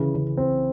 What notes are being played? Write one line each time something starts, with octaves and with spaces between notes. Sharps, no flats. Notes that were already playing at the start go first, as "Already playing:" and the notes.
Already playing: C#3 E3
C#3
C4